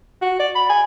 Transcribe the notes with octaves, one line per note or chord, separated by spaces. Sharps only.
F#4
D5
B5
G#5